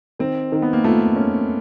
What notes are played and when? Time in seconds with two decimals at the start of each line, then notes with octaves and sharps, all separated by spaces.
0.19 D#3 C4
0.52 D#3
0.62 B3
0.73 A#3
0.84 A3 F4
1.16 C#4